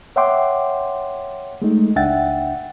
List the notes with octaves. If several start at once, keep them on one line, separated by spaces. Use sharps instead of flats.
C#5 E5 F#5 G5 C6 D6
G#3 A3 D#4
C#2 D4 E5 F#5 G5 A6